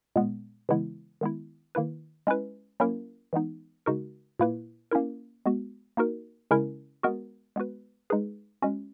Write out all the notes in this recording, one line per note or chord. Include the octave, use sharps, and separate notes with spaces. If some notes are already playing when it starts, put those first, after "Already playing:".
A#2 G#3 B3
C#3 E3 G#3 B3 E4
D#3 G#3 B3 E4
D#3 A#3 E4 B4
G#3 C#4 E4 B4
F#3 A#3 C#4 E4 A#4
E3 G#3 B3 D#4
C#3 G#3 D#4 F#4 A#4
A#2 A#3 E4 B4
A#3 C#4 E4 A#4
G#3 B3 F#4
A#3 D#4 F#4 A#4
C#3 G#3 C#4 E4 A#4
G#3 B3 F#4 A#4
G#3 B3 F#4 B4
G#3 D#4 G#4 B4
G#3 C#4 F#4